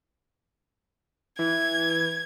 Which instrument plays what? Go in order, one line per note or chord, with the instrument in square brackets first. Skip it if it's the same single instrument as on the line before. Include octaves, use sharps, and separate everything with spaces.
[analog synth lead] E3 [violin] G#6